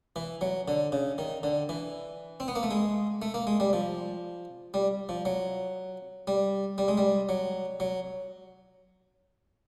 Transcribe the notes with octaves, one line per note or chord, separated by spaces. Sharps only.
E3
F#3
D3
C#3
D#3
D3
E3
C4
B3
A#3
A3
G#3
A3
A#3
G#3
G3
F3
G3
F3
F#3
G3
G3
G#3
G3
F#3
F#3